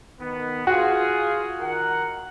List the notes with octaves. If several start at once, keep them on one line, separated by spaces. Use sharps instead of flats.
D#3 B3
F4 F#4 G#4
D#3 A#4 F#5